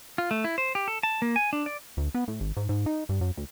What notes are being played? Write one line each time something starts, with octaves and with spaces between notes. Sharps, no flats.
F4
A3
E4
C5
G4
A4
A5
A#3
G#5
D4
D5
D2
B3
A2
G#1
G#2
G#2
D#4
G2
F#2
D2